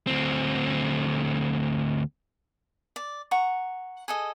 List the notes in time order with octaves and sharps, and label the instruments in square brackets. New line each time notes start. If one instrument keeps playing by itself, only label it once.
[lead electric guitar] D2 C4
[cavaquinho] D5
F#5 A#5 C#6
G#4 A4 D#5